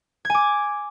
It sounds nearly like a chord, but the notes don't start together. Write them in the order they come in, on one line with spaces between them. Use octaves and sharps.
G#6 G#5 D6